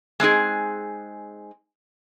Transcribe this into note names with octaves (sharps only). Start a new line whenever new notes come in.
G#3 C4 D#4 G#4